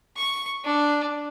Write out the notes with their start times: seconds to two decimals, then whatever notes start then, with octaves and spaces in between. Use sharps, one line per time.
0.17 C#6
0.64 D4